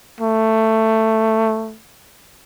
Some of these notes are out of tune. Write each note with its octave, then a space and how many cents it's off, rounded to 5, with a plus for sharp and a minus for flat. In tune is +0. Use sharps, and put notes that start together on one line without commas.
A3 +10